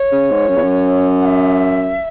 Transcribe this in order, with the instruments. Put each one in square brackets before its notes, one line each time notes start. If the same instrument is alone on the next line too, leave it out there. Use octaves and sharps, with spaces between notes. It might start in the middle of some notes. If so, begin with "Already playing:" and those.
Already playing: [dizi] C#5
[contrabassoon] C#3
G#2
F#2
E2
F#2
[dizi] F#5
E5